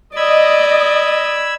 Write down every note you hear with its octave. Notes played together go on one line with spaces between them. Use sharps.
D5 D#5 B5 E6 G#6